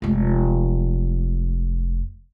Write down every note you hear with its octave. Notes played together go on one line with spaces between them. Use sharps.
F1 G#3